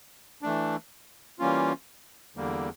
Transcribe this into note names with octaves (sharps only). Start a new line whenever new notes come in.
E3 A3 D4
E3 G3 A#3 C#4 F4
E2 D3 G3 A#3